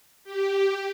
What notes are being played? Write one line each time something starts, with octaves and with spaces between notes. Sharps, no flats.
G4